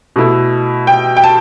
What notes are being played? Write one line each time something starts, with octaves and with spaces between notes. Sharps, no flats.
B2 A3 E4
G5
G5
A5